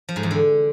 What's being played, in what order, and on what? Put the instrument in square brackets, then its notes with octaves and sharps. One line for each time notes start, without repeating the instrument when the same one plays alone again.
[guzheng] F3
G#2
E2
D3